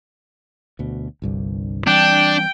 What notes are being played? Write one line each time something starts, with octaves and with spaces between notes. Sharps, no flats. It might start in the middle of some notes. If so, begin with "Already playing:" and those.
D2 B2
G1 C2 G2
E3 G3 C4 D4 G5